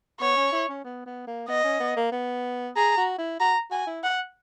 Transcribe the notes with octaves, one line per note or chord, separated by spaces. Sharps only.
B3 C#5
C#4
E4
C#4
B3
B3
A#3
B3 D#5
C#4
B3
A#3
B3
G#4 A#5
F#4
E4
F#4 A#5
F#4 G#5
E4
F#5